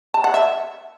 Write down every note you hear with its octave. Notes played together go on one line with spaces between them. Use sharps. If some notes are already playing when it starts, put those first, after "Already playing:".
A5
F#5
E5